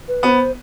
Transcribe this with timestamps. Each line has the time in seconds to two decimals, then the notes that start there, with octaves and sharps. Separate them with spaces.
0.08 B4
0.23 B3 C5